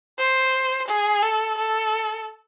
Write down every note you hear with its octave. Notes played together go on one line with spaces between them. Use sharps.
C5
G#4
A4
A4